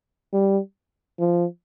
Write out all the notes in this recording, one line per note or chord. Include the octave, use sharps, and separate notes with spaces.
G3
F3